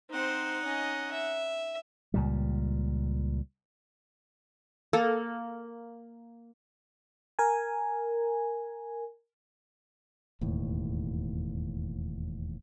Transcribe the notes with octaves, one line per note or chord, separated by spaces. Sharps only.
C4 D#4 C5 F#5
C#4 D#5
E5
C#2 A#2 G3
A#3 A4
A#4 G#5
E1 D#2 A2